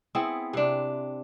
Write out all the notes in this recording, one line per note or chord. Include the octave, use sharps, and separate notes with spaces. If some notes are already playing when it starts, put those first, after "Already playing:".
B3 C4 E4 G#4
C3 D4